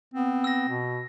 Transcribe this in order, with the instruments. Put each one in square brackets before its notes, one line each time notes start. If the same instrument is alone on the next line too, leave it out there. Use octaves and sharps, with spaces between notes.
[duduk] B3 [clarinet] C4
[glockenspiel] E6 A#6
[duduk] B2